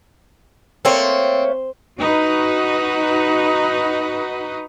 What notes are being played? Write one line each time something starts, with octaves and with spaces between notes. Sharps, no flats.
A3 A#3 C4 C#5
D#4 F#4 B4